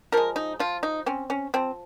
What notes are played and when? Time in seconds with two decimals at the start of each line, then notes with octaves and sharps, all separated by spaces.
0.12 F3 G#3 A#4
0.36 D#4
0.59 F3 F4
0.83 D#4
1.06 C4 C#4
1.30 C#4
1.54 F3 C4